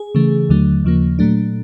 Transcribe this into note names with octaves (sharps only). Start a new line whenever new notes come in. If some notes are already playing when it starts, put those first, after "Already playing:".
Already playing: G#4
C#3 E3 A3
D#2 D3 F#3 A3
D#2 C#3 F3 A#3
A#2 F#3 A3 D4